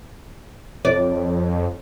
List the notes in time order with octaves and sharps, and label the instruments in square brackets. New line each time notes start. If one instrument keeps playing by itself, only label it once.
[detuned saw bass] F2 [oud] D5